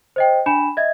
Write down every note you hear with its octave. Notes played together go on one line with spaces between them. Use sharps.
C5 D#5 G5
D4 G#5 B5 E7
D#5 E5 G#6